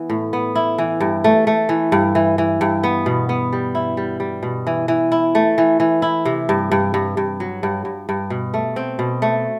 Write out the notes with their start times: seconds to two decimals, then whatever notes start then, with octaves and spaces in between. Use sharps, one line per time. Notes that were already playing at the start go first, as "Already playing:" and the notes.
Already playing: E3 B3
0.10 A2
0.33 B3
0.55 E4
0.78 E3
1.00 G2
1.24 A3
1.47 A3
1.69 E3
1.92 G2
2.15 E3
2.38 E3
2.61 G2
2.84 B3
3.06 B2
3.29 B3
3.53 G3
3.75 E4
3.97 G3
4.20 G3
4.43 B2
4.67 E3
4.88 E3
5.12 E4
5.35 A3
5.58 E3
5.80 E3
6.02 E4
6.25 C3
6.49 G2
6.72 G2
6.94 G2
7.17 G2
7.40 F#3
7.63 G2
7.85 G2
8.09 G2
8.30 B2
8.54 A3
8.76 C4
8.99 B2
9.22 A3